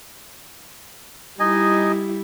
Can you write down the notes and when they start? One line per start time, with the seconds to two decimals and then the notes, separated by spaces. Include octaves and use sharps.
1.40 G3 D#4 E4 D#5 G#5